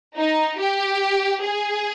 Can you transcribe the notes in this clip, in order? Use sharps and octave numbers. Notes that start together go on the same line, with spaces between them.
D#4
G4
G#4